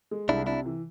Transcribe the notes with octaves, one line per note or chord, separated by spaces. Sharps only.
G#3
C2 D4 E4
C3 D4 E4
E3